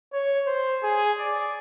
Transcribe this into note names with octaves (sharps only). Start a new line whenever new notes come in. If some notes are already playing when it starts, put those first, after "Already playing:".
C#5
C5
G#4
D5